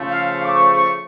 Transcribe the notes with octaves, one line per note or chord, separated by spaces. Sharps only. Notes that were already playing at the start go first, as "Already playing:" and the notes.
Already playing: C#3 F3 A3
F5
F5
D6
C#6
C#6